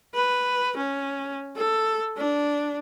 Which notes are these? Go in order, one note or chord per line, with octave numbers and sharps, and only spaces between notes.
B4
C#4
A4
D4